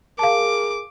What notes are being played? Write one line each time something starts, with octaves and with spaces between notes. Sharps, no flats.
G#4 A#4 F5 A5 D6